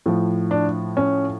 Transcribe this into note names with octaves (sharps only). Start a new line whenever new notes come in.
A2 F3
D4
C#4